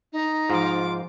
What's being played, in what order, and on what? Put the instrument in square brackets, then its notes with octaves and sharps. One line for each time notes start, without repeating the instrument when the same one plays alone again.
[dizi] D#4
[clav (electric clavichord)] G#2 [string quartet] F3 D6 [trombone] F4